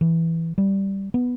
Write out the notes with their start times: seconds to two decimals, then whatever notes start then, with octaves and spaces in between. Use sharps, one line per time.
0.01 E3
0.58 G3
1.14 B3